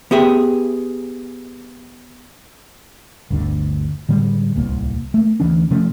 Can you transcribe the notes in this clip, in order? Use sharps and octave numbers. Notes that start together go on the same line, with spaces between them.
B3 G4 G#4 E5
G1 D2 D3
A2 D3 G3 G#3
D1 C2 A#3
A3 A#3
D2 E3 C#4 D4
C3 F3 A3 C#4